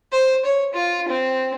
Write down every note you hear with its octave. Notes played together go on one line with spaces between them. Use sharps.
C5
C#5
F4
C4